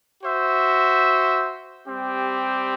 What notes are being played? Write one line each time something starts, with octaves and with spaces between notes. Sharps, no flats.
F#4 C5 E5
G3 C4 G4